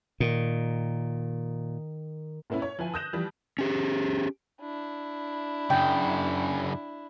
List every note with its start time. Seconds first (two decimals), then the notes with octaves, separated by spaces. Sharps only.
0.20 A#2 D#3
2.50 A#2 A3 B3 C#4 E4
2.62 C#5
2.79 F3 E4 B4 G#5
2.94 D#6 F#6 G6 A#6 E7
3.13 E3 F3 G3
3.59 C#4 G4 G#4
4.60 D4 E4
5.70 F#2 C#3 G5